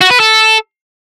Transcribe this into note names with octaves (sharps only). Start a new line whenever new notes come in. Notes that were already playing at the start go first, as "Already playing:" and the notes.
F#4
B4
A4